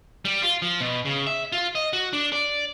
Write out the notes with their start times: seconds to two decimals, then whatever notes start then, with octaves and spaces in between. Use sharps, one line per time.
0.25 G3
0.42 F4
0.62 F3
0.80 B2
1.05 C#3
1.27 E5
1.52 F4
1.75 D#5
1.93 F#4
2.13 D4
2.33 D5